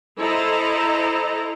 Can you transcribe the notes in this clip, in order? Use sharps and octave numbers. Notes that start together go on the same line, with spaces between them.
E4 A4 C5 D#5 A#5